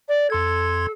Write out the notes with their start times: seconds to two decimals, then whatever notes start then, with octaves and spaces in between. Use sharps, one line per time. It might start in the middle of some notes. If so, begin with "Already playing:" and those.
0.08 D5
0.30 F2 A4 C6 G#6